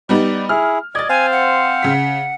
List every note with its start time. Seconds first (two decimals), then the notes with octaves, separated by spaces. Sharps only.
0.09 G3 B3 D#4 D5
0.49 E4 G#4 F6
0.95 D5 D#5 G#6 A6
1.09 C4 C5 F5 G#5
1.32 F#5
1.83 C#3 B6